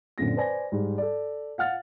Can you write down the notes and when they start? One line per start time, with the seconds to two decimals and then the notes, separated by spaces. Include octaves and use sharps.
0.18 F#2 A#2 D3 C4 A#6
0.36 B4 C5 D5 G#5 A#6
0.72 G#2 G3
0.98 A4 D5
1.58 F5 F#5 F6 A6